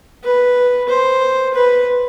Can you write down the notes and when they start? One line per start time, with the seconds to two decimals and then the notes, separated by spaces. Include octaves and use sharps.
0.24 B4
0.89 C5
1.54 B4